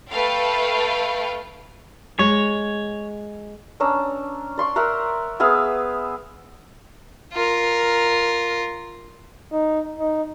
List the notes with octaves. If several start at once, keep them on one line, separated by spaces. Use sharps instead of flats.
A3 A4 B4 F5 G5
G#3 C#5
C#4 D4 A#5 E6
D5 C6 C#6
A#4 E5 F#5 A#5
B3 G#4 E5 F5
F4 A#4
D#4
D#4